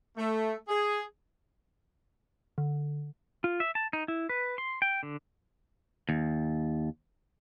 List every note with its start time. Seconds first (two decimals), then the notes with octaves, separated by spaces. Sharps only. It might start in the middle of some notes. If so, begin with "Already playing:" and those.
0.17 A3
0.69 G#4
2.58 D3
3.44 F4
3.60 E5
3.75 A5
3.93 D#4
4.08 E4
4.29 B4
4.58 C6
4.82 G5
5.03 D3
6.09 D#2